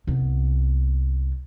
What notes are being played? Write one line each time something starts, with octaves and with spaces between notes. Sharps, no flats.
C2 B3